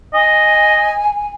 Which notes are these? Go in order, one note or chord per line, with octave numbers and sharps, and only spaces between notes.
D#5 G#5